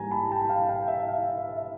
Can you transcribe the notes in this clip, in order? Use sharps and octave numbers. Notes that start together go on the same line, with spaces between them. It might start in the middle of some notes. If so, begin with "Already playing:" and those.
Already playing: G#2 E3 G3 A#3 G#5 A#5
A5 B5
G5 A5
F5 G5
F5 G5
E5
F5
E5
E5
E5